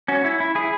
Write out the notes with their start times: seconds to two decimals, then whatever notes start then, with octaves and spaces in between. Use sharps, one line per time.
0.08 C#4 F#4
0.24 E4
0.40 E4
0.55 E4 G#4